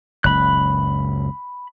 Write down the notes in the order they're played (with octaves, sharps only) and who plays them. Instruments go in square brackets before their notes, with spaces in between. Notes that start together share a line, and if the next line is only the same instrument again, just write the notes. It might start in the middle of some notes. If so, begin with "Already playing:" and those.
[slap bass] F#1 C#2 [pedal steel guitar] B5 F#6